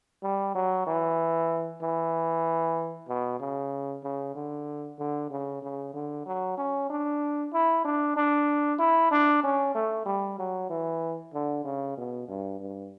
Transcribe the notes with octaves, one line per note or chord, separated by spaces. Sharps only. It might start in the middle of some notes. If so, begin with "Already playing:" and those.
G3
F#3
E3
E3
B2
C#3
C#3
D3
D3
C#3
C#3
D3
F#3
C#4
D4
E4
D4
D4
E4
D4
C#4
A3
G3
F#3
E3
D3
C#3
B2
G2
G2